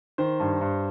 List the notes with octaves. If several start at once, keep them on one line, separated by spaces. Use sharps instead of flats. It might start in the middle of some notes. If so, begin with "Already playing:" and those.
D#3 C5
G2
G2